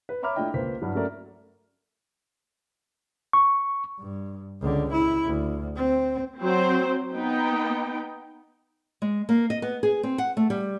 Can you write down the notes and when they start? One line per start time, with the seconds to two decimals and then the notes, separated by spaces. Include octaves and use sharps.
0.09 B4
0.22 C#5 E5 A#5 B5 D6 F6
0.36 A3 D4 E4 F4 D#5 G5
0.54 C#2 A#3 B4 C5 B6
0.81 G2 F#3 E4
0.95 F#3 A3 C#4 A4 A#4 D5
3.33 C#6
4.00 G2
4.61 C#2 D3
4.93 E4
5.25 D2
5.76 C4
6.40 F#3 C4 C5
7.15 B3 D#4 G5
9.02 G#3
9.29 A#3
9.50 D#5
9.62 B3
9.83 G#4
10.03 C4
10.18 F#5
10.37 A3
10.50 G3